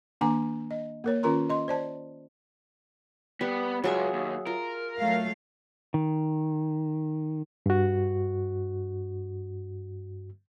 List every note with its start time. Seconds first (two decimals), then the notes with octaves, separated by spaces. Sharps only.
0.21 D#3 A#3 D4 G#5 A#5 D6
0.71 D#5
1.04 A#3 A#4 C#5
1.23 D#3 C#4 F4 A#4 A#5 C6
1.50 D#5 C6
1.68 C5 D5 A5
3.41 G3 B3
3.84 C#2 F#3 G#4 E5
4.13 D#2
4.47 F4 A#4
4.98 F#3 A3 F5
5.94 D#3
7.66 G2 F#4